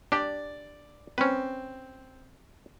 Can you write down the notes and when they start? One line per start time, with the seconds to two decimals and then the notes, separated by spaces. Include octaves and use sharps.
0.12 D4 G4 D5
1.18 C4 C#4 B4